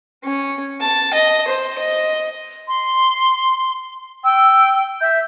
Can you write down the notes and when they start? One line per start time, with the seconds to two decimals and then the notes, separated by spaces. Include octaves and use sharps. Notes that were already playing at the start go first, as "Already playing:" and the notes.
0.23 C#4
0.81 A5
1.13 D#5
1.47 C5
1.78 D#5
2.68 C6
4.24 G5 E6
5.01 E5 G6